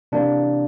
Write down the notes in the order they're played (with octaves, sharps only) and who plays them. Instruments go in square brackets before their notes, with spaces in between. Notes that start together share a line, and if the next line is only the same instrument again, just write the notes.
[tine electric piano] C3 E3 A#3 D4